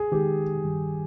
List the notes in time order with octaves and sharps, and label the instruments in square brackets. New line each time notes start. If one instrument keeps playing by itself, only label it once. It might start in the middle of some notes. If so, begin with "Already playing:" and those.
Already playing: [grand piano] G#4
[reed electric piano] D#3 G#3 D#4 [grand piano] G4
[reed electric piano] G2 D#3 G3